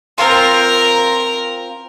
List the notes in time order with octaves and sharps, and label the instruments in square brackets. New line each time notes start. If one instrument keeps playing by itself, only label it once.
[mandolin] C4 F4 [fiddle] A#4